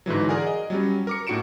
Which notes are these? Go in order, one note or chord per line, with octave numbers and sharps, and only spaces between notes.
G#2 D3 E3 F#3
G#4 A#4 D5 F#5 G#5
D#5
F#3 G3 C#4
A#4 D6 C#7
A2 D4 F#4 C#7 D7 E7